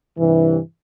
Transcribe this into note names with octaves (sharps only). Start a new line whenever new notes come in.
G2 C3 E3